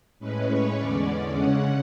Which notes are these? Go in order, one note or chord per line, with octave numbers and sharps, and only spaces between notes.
A2 G#3 C#4 B4
C#5
E2 D3 G#3 C#4 D5
C#3 G#3 C#4 F#5